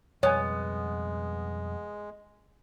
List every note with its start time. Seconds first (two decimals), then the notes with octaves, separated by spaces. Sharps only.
0.23 F2 B2 G3 G#3 B3 C#5 G#5